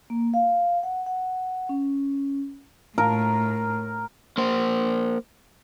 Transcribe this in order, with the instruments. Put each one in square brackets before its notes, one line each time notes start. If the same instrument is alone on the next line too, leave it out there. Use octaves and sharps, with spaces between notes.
[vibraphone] A#3
F5
F#5
F#5
C#4
[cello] A2 [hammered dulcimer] A#4
[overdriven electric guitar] A#3 C5